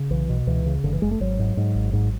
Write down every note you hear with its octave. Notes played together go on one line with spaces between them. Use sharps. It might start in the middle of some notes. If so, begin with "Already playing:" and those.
Already playing: C#3
B1 E3
B2
C#2 E3
C#3
F#1 D3
E3
F#1 G#3
A3
G#1 F#3
G#2
G#2
G#1
G#2